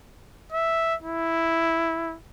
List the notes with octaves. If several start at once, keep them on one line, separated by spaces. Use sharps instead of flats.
E5
E4